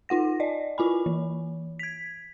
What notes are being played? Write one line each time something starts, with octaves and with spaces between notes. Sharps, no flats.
D#4 F4 F#5 A#6
D5 D#5
E4 F4 G#5 B5
E3
G#6 B6